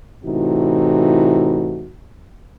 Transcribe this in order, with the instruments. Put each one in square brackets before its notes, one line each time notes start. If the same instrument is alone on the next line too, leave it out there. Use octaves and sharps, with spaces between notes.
[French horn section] A2 C3 E3 D#4 F#4